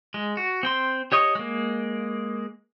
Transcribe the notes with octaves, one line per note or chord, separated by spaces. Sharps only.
G#3
F#4
C4 G5 C6
G4 C#5 D#5 C#6
G#3 A#3